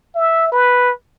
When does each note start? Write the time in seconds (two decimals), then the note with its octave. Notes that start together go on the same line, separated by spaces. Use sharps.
0.15 E5
0.52 B4